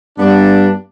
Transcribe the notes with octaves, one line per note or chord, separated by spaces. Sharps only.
G2 B3 D4